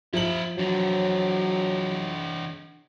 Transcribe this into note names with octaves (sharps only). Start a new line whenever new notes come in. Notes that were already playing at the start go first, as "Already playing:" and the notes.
F3 F4 E5 F#7
E3 F#3 D4